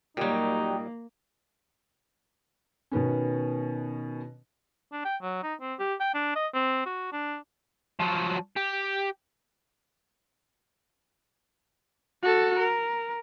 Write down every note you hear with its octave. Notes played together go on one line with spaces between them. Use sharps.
A#2 F#3 G3 A#3 D#4 G4
B2 D#3 B3 C#4
D4
G5
F#3
D#4
C4
G4
G5
D4
D#5
C4
F#4
D4
F3 F#3
G4
F#4 A4
A#4